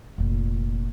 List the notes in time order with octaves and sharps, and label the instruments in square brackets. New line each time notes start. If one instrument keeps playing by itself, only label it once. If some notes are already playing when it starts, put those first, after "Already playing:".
[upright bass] F1 A#2